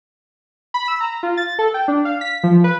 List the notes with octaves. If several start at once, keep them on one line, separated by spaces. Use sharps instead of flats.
B5
E6
A#5
F4
A6
A4
G5
D4
F5
B6
F3
B4